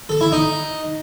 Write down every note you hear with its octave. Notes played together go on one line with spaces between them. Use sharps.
A4
E4
D#4